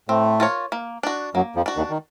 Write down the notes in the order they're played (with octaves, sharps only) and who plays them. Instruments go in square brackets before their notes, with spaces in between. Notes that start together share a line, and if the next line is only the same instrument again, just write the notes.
[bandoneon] A2 A3 [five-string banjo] C4
[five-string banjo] F4 A#4 C#5
A#3
D4 F#4
[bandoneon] F#2 F#3 [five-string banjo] A#3
[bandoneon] F2 F3
[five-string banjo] D4 F#4
[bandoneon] D#2 D#3
D#3